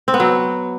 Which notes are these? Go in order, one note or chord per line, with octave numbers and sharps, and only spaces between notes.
C4
B3
F#3